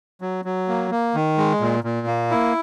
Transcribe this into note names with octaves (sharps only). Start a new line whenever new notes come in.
F#3
F#3
A#3
A#3
D#3
G#3
A#2
A#2
A#3
E4